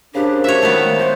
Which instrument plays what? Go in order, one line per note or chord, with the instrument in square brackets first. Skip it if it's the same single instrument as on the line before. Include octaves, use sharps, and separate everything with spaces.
[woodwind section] G#2 C#3 D4 [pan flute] G4 [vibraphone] A#4 C5 F5
[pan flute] F#4 [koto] C#5 E5
[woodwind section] D#3 [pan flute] G#3 [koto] A3 B3
[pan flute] G#3 [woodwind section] F#4 C5